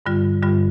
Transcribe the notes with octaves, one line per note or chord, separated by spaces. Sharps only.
G2 D3 G3 F4
G2 D3 G3 F4